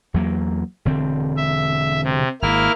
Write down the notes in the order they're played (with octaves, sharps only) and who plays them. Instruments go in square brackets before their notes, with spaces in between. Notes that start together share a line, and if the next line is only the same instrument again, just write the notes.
[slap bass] E2 F#3 A#3
E1 D3 C4
[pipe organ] E5
C3
[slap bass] G#1 [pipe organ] A#3 E4 F6